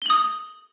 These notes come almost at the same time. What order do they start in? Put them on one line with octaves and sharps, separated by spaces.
G7 F#7 D#6